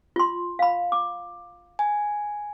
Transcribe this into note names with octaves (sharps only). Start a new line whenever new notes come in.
F4 C6
F5 B5
D6
G#5